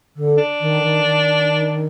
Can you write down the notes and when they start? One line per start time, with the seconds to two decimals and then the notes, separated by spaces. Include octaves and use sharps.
0.16 D3
0.38 D4
0.60 D#3
0.82 D#3
1.03 D#3